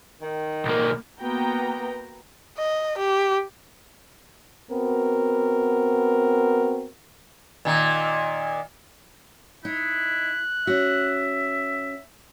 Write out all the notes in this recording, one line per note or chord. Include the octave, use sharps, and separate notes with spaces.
D#3
B1 A#3
A#3 B3 F#4 B4 G5 A#5
D#5
G4
B3 C4 F#4 A#4
A#2 D#3
D#4 E4 F#6
C#4 F#4 E5